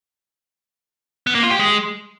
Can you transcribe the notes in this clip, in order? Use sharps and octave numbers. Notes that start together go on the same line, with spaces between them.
B3
A#3
F4
G4
G#3